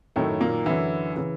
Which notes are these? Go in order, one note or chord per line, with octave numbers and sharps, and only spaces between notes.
F#2 A2 D#3 A3
A#2 A#3
F#2 D3 E3 E4
C#3 E3